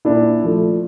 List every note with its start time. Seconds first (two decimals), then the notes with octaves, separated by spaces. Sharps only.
0.05 A#2 D4 E4
0.44 F3 A3